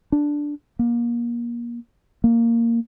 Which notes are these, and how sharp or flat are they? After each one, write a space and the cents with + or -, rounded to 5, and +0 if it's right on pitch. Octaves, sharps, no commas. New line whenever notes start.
D4 +0
A#3 +30
A#3 -10